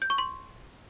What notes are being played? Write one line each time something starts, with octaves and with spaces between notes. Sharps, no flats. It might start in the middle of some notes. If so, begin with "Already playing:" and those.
G6
C#6
C6